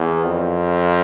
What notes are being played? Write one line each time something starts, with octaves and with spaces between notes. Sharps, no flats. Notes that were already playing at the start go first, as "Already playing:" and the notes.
Already playing: E2
F2